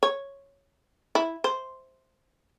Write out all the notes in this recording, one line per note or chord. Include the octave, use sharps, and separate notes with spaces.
C#5
E4
C5